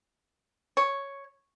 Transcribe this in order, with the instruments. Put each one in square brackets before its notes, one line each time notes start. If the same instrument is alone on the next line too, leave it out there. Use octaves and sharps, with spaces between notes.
[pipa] C#5